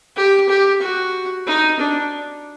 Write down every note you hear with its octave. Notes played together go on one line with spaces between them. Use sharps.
G4
G4
F#4
D#4
D4